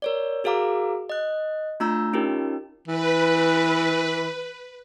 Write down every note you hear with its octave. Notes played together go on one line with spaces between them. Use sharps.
A#4 C#5 D5
F#4 G#4 A#4 F5 A#5 D6
D#5 F#6
A3 D4 F4 A#5 E6 G6
C#4 D#4 F4 G4 A#4
E3 B4